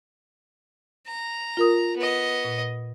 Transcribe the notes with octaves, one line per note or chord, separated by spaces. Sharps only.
A#5
F4 A#4 D#6
B3 D#5
A#2